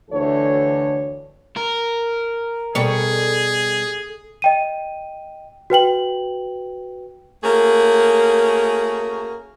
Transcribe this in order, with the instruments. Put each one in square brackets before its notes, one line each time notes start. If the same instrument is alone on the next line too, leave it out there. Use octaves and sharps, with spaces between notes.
[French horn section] D2 D3 E3 A4 C#5
[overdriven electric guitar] A#4
[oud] B2 G3 C#5 [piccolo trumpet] G#4 [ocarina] A4
[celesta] D#5 G5 D#7
F#4 B4 G5 F#7
[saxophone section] A3 A#3 C#4 F#4 G#4 A#4